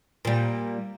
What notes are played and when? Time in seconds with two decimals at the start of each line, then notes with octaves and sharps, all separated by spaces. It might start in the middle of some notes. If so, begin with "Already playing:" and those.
0.25 A#2 G3